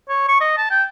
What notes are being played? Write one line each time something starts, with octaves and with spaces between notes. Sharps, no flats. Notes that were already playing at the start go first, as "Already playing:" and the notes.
C#5
C#6
D#5
A5
G5